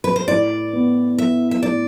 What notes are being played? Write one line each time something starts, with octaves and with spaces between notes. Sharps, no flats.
B4
C5
A2 D5
B3
B3 E5
E5
A2 D5